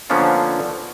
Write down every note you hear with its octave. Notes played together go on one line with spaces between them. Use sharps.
D3 F3 A#3 B3 C#4 D4